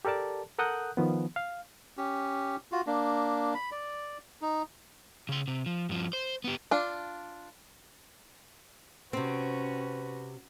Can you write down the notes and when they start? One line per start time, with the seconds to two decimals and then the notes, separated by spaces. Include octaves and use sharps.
0.05 G4 A4 A#4 D5 A5
0.58 A4 A#4 F#5 D#6 F#6 G6
0.97 D#3 F3 B3
1.36 F5
1.97 C#4 G4
2.72 F4 F#4
2.87 A#3 D4
3.55 B5
3.72 D5
4.41 D#4
5.29 C#3 C6
5.48 C3
5.66 F3
5.89 G2 F3
6.13 C5
6.44 B3 G4
6.71 D4 F4
9.13 C3 C4 C#4 F#4 B4